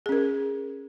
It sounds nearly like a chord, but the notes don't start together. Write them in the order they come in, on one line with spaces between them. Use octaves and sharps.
G#4 C#4 A#4